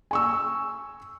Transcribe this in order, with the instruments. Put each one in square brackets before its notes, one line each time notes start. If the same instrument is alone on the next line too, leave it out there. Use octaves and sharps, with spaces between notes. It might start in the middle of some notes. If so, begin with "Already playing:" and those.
[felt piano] G#5 C#6 E6